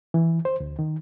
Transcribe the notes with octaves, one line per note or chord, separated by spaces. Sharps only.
E3
C5
D2
D#3